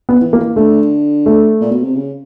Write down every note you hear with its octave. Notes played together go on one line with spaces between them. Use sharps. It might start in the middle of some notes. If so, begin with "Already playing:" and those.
B3
E3
A#3
D3 A3
A3
A#2
B2
C3
C#3